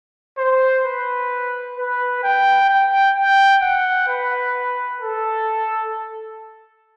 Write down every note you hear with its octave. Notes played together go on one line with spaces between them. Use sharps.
C5
B4
B4
G5
G5
G5
F#5
B4
A4